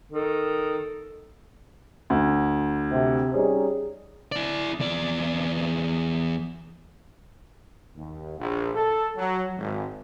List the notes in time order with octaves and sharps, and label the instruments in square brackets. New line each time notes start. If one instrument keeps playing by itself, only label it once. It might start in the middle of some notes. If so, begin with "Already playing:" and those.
[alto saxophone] D#3 [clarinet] A4
[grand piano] D2
[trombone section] C3
[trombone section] G3 C#4 D#4 [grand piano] G#4
[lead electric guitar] E4 D5
E2 D5
[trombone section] D#2
A#1
A4
F#3
G#1